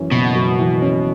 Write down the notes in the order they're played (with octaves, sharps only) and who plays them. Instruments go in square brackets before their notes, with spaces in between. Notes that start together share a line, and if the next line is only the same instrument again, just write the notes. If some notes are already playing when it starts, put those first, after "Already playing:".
Already playing: [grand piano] F#2 E3 C#4
[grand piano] F#1 [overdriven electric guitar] B2
[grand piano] F#2
E3
C#4